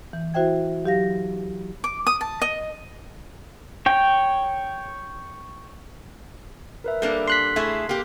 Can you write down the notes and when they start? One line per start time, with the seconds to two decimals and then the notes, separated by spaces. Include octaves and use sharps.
0.13 E3
0.34 E4 F#4 C5 E5 G5 G#6
0.84 F#3 G4 F5 A#6
1.84 D6
2.07 D#6
2.21 A5
2.42 D#5
3.86 C#5 G5
6.84 A#4 B4 E5
7.02 G3 A#3 D4 A4
7.28 C6 F#6 B6
7.56 A3 E4 G#4
7.89 A#3 G4